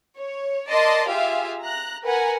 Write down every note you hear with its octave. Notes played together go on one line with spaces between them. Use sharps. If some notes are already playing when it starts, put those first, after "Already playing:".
C#5
A#4 D5 D#5 A5 C6
F4 G4 G#4 E5 F5
A#5 F#6
A#4 B4 F#5 G#5 A#5